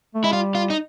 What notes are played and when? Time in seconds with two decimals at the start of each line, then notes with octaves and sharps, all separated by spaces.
0.15 A3
0.24 G#3 E4
0.32 G3 F4
0.55 F4
0.70 D#4